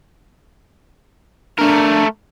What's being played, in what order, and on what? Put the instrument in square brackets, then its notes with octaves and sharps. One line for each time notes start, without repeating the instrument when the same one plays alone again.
[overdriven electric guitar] A3 A#4 [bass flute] D4